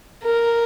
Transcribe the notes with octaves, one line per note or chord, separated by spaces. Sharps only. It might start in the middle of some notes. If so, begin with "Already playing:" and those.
A#4